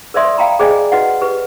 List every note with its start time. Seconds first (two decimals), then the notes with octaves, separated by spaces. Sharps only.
0.14 A#4 C5 D5 E5 C6 D#6
0.38 F5 G5 A#5 B5
0.59 G#4 C5 D5 D#5 G5 G#5
0.92 F#4 B4 D#5 F#5
1.22 G4 B4